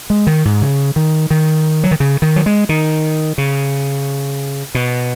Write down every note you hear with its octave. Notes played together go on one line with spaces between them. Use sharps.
G#3
D#3
G#2
C#3
D#3
D#3
F#3
D#3
C#3
D#3
F#3
G#3
D#3
C#3
B2